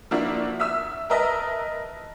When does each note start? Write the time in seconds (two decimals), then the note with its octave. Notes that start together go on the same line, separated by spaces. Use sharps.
0.11 F3 A#3 D4 E4 F#4
0.60 E5 D#6 E6
1.10 A#4 B4 D#5 E5 A5